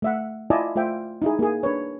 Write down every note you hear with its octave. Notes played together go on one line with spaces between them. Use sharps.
A3 E5 F#5
E4 F4 D5 D#5 G#5 A5
A3 F4 C5 E5 G5
D#4 E4 G#4
A#3 G#4
D4 B4 C#5